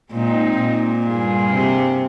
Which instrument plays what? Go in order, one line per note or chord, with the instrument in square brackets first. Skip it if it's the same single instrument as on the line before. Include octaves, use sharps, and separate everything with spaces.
[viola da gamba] A#2 [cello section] G#3 C4 D#4
[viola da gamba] A#2
[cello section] G2 G3 A#3 F4 G#4
[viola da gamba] C3